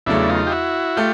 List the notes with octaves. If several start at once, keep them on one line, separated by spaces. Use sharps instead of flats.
E2 C#3 F#3 A3 D4 E4
D#4 F4
G4
E4 F#4
A3 F4 G4